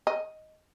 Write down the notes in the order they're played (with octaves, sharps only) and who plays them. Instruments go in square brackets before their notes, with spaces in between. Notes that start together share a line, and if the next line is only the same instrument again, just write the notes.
[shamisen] D#5